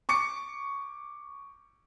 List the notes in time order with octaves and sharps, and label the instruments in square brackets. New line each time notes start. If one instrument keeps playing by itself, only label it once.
[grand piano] C#6 D6 C#7